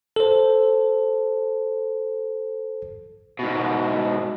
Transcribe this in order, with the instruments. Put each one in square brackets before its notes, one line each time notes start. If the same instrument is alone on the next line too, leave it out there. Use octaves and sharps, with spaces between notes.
[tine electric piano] A4 C5
[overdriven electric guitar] G#2 B2